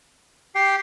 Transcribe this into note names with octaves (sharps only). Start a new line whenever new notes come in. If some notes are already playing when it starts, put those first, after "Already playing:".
G4 G5 C7